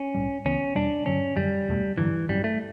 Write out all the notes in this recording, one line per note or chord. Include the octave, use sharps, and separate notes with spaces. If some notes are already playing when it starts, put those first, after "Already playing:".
Already playing: C#4
B1 A2 G3
C#2 C#3 E3 B3 C#4
E1 E2 B2 G3 D4
G2 D3 F#3 C#4
F#2 D3 F#3 G3
F#1 E2 B2 A3
A1 G2 D3 E3 F#3
A1 G2 F#3 G3 C#4
A3